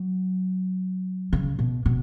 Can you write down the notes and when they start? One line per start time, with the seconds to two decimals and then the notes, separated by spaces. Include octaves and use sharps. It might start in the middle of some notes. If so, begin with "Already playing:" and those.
Already playing: F#3
1.33 C#3
1.59 B2
1.86 B2